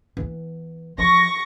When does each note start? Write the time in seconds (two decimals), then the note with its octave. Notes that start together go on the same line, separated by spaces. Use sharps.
0.17 E3 B3
0.98 F3 C#6 A#6